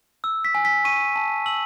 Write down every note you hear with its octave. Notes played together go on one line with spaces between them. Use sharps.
E6
B6
G#5
B6
C#6 D#7
A5
E6 F#7